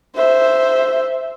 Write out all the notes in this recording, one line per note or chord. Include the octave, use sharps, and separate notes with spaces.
C5 E5